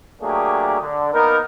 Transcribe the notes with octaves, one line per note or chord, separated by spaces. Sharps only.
F#3 A3 A#3 D4 G4 G#4
D3
A#3 B3 D#4 A#4